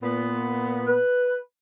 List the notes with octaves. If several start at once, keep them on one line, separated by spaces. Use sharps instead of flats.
A#2 B3
B4